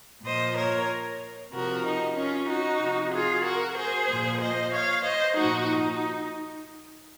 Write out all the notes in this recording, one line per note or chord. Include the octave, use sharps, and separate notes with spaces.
A#2 F3 C5 D#5
A#4 C#5
C3 F3 F#4 A#4
D#4
C#4 F4
D#4 F#4
C3 F3
F4 G#4
F#4 A#4
G#4 C5
A#2 F3
C5 D#5
C#5 F5
C5 D#5
A#2 F3 D#4 F#4
D#4